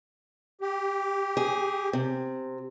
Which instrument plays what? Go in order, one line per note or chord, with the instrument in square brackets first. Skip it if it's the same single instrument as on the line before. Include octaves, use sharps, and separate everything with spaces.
[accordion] G4
[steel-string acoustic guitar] G#4
C3